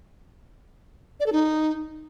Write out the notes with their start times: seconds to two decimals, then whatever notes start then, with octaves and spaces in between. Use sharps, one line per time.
1.20 D5
1.26 A4
1.33 D#4